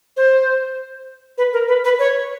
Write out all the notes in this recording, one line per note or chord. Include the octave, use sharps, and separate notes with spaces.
C5
B4
A#4
B4
B4
C#5